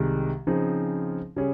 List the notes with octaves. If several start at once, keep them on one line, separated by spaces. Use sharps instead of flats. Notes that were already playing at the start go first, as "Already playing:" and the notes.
Already playing: C2 C3 D#3 G#3
C#3 F3 C4 D#4 G#4
C#3 G3 C#4 G#4